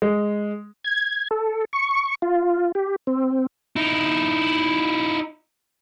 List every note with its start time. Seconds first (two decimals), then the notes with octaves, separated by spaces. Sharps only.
0.02 G#3
0.84 G#6
1.31 A4
1.73 C#6
2.22 F4
2.75 G4
3.07 C4
3.76 D#4 E4